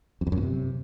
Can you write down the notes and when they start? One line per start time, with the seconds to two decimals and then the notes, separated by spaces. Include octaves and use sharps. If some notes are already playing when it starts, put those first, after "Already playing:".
0.21 F2
0.27 E2
0.32 F#2
0.37 A#2
0.43 C3